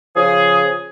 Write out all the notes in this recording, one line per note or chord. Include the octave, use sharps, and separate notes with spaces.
C#3 F3 G#4